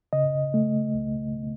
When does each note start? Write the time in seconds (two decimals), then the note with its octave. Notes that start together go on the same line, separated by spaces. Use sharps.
0.13 C#3 D#5
0.54 A3
0.94 C#2